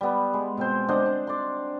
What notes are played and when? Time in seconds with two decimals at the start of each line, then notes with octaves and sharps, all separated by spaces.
0.01 G3 B3
0.33 G#3
0.57 B2 C4 C5
0.88 D4 C5 D#5 F#5
1.06 D4
1.27 D5 C6